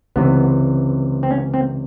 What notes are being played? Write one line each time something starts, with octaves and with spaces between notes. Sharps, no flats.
C#2 C3 E3 B3
C4
C#4
C4